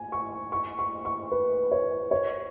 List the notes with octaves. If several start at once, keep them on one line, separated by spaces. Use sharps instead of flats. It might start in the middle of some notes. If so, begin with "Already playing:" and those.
Already playing: G#5
C#6
C#6
C#6
C#6
B4
C#5
C#5